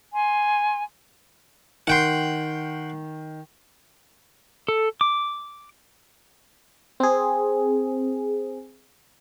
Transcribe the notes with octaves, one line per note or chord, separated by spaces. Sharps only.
G#5 C6
D#3 F#5 G5 C6
A4
D6
C4 G#4